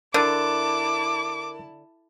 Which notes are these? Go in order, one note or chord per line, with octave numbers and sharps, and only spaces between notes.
D3 E4 A#4 A5 D6 F#6 A6